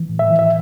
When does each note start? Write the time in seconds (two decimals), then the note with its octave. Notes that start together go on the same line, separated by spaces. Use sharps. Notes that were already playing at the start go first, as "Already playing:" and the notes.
Already playing: E3
0.09 A2
0.19 E5
0.30 E3
0.39 E5